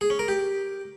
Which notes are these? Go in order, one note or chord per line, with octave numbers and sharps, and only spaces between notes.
G#4
C#4
A#4
G4